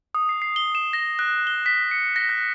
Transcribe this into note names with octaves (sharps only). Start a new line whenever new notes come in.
D#6
C7
C7
G7
E7
A#6
F#6
G7
B6
C#7
A#6
F#6